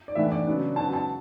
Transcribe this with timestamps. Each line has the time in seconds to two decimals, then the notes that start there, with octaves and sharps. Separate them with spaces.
0.08 D5
0.15 A2 E3 B3 D4 E5
0.32 D5
0.46 C#3 F#3 B3 D4
0.76 C#3 F#3 B3 A5
0.94 A5